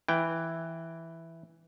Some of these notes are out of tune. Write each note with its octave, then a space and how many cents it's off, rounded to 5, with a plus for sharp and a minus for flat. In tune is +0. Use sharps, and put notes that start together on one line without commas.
E3 +0 G5 +0